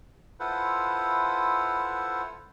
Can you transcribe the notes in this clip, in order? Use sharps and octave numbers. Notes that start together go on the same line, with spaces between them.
E4 F4 A4 B4 C5 F#5